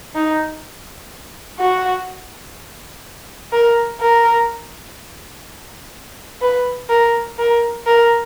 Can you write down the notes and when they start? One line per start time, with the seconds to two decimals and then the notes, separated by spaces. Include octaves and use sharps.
0.15 D#4
1.59 F#4
3.52 A#4
4.01 A#4
6.41 B4
6.89 A#4
7.39 A#4
7.86 A#4